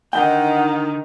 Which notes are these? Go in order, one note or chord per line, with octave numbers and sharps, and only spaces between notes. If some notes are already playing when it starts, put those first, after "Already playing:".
D3 D#3 D#4 D#5 F#5 G5